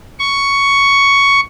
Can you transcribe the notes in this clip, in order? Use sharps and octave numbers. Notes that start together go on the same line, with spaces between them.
C#6